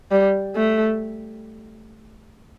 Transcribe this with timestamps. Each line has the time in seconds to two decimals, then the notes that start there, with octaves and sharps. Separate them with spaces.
0.11 G3
0.56 A3